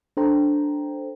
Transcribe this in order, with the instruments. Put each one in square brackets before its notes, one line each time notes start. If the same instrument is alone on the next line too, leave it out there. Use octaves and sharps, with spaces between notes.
[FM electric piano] D4 A4 C5 G5 A#5